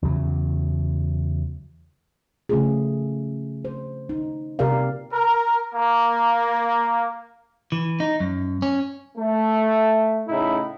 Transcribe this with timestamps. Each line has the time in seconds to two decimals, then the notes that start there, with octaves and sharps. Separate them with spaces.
0.03 E2 C#3 F#3
2.49 C#3 F3 A3 C#4 F4 G#4
3.65 C5
4.09 D#4
4.59 C3 G4 A#4 D5 F5
5.13 A#4
5.75 A#3
7.72 E3
8.00 D#4
8.20 F#2
8.62 C#4
9.18 A3
10.28 A2 C#3 D#4 E4